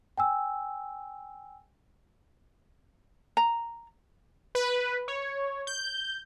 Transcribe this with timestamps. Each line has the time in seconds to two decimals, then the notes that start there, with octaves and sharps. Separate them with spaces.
0.18 G5 G#5 E6
3.37 A#5
4.55 B4
5.08 C#5
5.67 G6